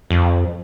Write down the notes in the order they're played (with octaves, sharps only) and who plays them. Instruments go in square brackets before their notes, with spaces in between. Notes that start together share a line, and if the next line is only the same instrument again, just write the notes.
[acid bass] F2